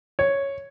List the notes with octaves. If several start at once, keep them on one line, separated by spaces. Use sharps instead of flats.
C#5